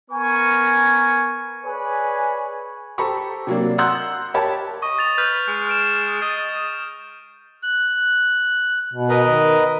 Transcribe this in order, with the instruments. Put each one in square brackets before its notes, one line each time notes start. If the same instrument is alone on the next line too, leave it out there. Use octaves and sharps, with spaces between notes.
[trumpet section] B3 A#4 G#5 C#6
G#4 B4 C#5 D5 G#5
[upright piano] G4 A4 C5 A#5 B5 C#6
C3 F#3 A#3 D4
F#5 A#5 C6 E6 F#6 G6
G4 A#4 C#5 A5 B5
[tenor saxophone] D#5 [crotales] C#6
[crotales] A6 F7
[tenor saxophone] B4 [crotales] F6 G6
[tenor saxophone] G#3
[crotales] F6 D7 E7
[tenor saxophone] D#5 [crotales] A6
[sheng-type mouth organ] F#6
[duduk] B2
[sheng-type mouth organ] A#4 B4 D#5
[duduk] D#3